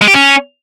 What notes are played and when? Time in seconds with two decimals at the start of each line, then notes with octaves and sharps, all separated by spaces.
0.01 G#3
0.08 G4
0.14 C#4